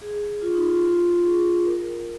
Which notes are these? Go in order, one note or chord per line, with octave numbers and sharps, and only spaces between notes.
G#4
F4
D#4
F4
F4
G#4
A#4